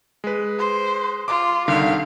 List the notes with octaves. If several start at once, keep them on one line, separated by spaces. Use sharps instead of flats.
G#3 B4
C5
F4 D6
C2 D3 D#3 F5